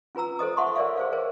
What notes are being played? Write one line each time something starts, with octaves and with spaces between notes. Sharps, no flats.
C#4 F4 B4 A#5 E6
A4 C5 D#5 D#6
E5 F#5 A5 C6 C#6
A#4 C#5 D5 E5 F5
G#4 C5 F5
A#4 C5 C#5